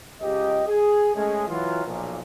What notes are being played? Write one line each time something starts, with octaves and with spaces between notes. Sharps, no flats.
C#2 G4 D#5
G#4
G#3 A3 C#4 G#4
E3 F#3 F4
B1 A#2 F3